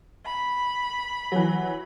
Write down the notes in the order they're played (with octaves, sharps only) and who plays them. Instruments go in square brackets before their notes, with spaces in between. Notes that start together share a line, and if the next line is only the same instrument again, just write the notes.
[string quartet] B5
[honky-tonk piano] E3 F#3